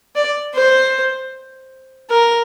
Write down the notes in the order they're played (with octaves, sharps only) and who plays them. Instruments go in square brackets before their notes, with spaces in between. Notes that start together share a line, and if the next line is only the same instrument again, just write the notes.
[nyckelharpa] D5
C5
A#4